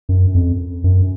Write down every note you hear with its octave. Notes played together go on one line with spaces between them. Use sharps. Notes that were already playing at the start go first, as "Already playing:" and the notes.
F#2
F2
F#2